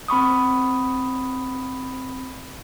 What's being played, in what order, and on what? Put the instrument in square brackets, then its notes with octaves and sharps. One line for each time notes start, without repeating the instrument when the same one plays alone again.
[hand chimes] C4 B5 C#6 D#6